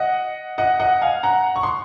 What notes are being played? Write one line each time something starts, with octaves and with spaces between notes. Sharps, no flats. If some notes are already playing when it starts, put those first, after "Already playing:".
Already playing: D#5 F#5
D#5 F#5
D#5 F#5
F5 G#5
F#5 A#5
C#6
C6